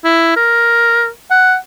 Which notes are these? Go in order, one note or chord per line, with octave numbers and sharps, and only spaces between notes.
E4
A#4
F#5